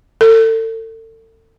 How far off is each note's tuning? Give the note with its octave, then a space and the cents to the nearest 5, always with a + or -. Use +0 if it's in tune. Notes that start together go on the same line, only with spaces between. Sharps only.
A4 +35